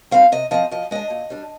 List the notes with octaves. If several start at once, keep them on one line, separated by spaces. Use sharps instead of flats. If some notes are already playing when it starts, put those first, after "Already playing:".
G3 C4 D#4 F5
C3 D#5
F3 C4 D#5
F3 D#5
G#3 D4 D#5
A#2
G3 D4